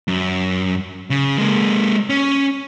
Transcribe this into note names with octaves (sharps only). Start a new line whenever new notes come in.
F#2
C#3
G#3 A#3
C#4